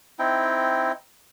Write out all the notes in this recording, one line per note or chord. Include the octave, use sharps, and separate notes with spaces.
C4 D#4 E4 G5